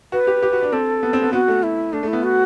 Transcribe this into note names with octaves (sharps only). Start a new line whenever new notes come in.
F#4 B4
G4
G4
F#4
D4
C4 A4
B3
C4
B3
B3 F#4
A3
E4
A3 D4
A3
E4
B3
F#4